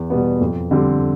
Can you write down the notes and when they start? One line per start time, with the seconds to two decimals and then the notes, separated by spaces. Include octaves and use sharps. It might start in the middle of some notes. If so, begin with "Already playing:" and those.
Already playing: E2
0.10 B2 G3 B3
0.41 F2
0.71 D3 G3 C4